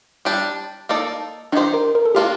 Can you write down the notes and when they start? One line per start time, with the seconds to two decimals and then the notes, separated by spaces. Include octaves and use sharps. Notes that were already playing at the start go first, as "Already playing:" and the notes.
0.25 G3 D4 G4
0.89 A#3 D#4 A4 D5
1.52 D#3 A3 D4 D#4 G4 C5
1.74 A#4
1.95 A#4
2.05 A4
2.15 D#3 A#3 D4 F4 G4